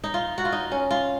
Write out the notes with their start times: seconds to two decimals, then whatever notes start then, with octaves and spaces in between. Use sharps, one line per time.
0.04 D#4
0.14 F4
0.38 F#4
0.45 F4
0.52 D#4
0.71 C#4
0.91 F4